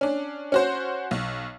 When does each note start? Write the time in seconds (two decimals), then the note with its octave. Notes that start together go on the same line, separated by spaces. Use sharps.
0.01 C#4 D4
0.52 C#4 F#4 C5
1.11 B1